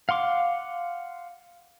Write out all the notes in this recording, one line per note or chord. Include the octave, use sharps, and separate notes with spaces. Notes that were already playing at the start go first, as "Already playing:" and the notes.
F5 F#5 C6 D6